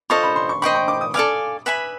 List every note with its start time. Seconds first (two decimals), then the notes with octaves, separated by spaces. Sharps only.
0.10 F4 A4 C5 D#5 C#6
0.23 B5
0.36 C6
0.49 C#6
0.62 C5 D#5 G5 B5 C#6
0.75 C#6
0.88 D6
1.01 D#6
1.14 A4 D5 F5 G#5 D6
1.66 B4 E5 G#5 B5